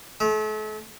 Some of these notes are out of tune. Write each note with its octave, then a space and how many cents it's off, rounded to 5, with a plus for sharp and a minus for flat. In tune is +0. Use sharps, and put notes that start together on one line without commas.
A3 -40